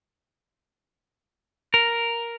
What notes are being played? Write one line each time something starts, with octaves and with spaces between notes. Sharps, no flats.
A#4